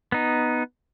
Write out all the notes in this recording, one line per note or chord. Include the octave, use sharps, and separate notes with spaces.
B3 D#4